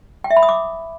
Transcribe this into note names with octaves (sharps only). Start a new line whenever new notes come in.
G5
E5
B5
D#6
D6